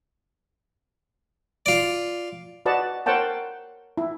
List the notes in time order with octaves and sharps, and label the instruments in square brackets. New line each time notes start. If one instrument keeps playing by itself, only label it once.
[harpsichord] F4 D5
[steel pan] F#4 B4 D5 D#5 F#5 A5
A#4 C5 C#5 F#5 G5 A5
E4